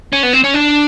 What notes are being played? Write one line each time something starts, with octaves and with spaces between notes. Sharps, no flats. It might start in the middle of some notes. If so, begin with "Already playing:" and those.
C#4
B3
C4
C#4
D4